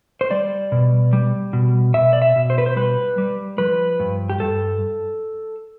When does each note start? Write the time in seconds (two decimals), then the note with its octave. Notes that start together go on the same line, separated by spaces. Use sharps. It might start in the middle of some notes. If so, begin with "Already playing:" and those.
0.21 C5
0.31 G3 D5
0.72 B2
1.13 G3
1.53 B2
1.94 B2 E5
2.13 D5
2.22 E5
2.36 B2
2.50 C5
2.58 B4
2.66 C5
2.76 G3 B4
3.18 G3
3.58 F3 B4
4.00 G2
4.30 G4
4.40 G2 A4